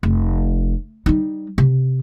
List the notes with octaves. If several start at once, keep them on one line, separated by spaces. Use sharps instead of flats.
F1
G3 D#4
C3